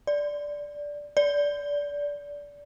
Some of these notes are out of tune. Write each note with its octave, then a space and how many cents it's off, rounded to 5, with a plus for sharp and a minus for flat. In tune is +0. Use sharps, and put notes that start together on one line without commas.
D5 -5
D5 -20